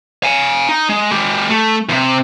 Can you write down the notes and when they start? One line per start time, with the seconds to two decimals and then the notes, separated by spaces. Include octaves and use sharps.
0.24 F5 G#5
0.69 D#4
0.89 G#3
1.11 G#3 G4
1.51 A3
1.89 E2 C3